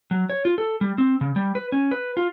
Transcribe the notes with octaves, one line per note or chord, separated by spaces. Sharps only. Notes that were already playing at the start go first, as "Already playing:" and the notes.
F#3
C#5
F4
A4
G3
C4
C#3
G3
B4
C#4
B4
F4